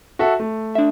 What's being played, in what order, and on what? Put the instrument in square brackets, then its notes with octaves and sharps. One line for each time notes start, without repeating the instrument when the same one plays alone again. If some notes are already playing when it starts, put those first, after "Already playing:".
[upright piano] F#4 A4 E5
A3
[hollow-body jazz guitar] D4 E5